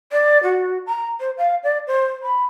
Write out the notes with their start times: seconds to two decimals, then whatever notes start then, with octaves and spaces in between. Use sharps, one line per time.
0.12 D5
0.43 F#4
0.86 A#5
1.20 C5
1.38 F5
1.63 D5
1.87 C5
2.23 B5